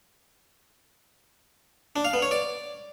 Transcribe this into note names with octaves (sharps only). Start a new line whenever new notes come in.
D4
F5
B3
C#5
D5